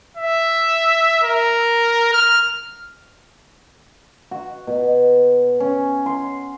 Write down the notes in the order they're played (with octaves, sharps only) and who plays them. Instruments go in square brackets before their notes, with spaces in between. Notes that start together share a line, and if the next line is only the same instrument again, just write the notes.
[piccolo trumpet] E5
A#4
F6
[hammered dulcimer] F#4
B2
C#4
C6